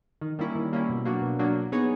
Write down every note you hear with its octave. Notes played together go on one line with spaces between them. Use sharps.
D#3
G3 A#3 C#4 E4
D#3
G3 A#3 C#4 E4
B2
F#3 A#3 D4 F#4
B2
F#3 A#3 D4 F#4
F#3
B3 D#4 G#4 C#5